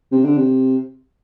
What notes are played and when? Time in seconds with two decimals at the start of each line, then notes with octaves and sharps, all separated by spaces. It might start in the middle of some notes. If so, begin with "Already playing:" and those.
0.12 C3
0.25 D3
0.37 C3